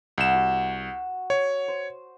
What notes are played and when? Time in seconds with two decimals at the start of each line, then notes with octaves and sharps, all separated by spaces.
0.18 C2 F#5 E7
0.35 F#4
1.30 C#5
1.68 C5